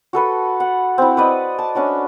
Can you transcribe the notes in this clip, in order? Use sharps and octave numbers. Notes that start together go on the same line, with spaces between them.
F#4 A4 B4 A5
F#5
C4 E4
B4 D5 D#5
A5
C#4 D4 F#4